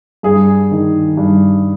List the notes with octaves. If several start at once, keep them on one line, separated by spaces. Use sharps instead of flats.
G2 G#4
D#3
G2